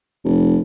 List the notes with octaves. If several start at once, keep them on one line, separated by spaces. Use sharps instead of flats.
F1